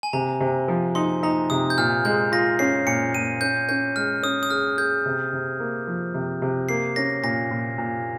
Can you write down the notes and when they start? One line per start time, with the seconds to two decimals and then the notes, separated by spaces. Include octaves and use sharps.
0.03 G#5
0.13 C3 A#5
0.41 C3
0.68 F3
0.95 D#4 C6
1.23 D#4 A#5
1.50 C3 D#6
1.70 G6
1.78 A#2 F6
2.05 G#3 G6
2.32 F4 A#6
2.59 C#4 C7
2.87 A#2 C#7
3.15 A#2 D#7
3.41 C#4 G6
3.69 C#4 G6
3.96 G#3 F6
4.23 C#4 D#6
4.43 D#6
4.50 G#4 F6
4.78 G#4 G6
5.06 C3
5.33 C3
5.60 A#3
5.87 F3
6.14 C3
6.42 C3
6.69 A#3 C7
6.96 C#4 A#6
7.23 A#2 A#6
7.51 A#2
7.78 A#2